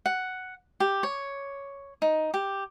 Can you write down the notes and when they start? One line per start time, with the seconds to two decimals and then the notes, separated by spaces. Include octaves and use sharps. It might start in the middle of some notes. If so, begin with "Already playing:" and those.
0.06 F#5
0.80 G4
1.03 C#5
2.02 D#4
2.34 G4